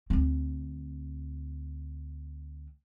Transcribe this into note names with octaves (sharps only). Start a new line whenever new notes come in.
D2 C4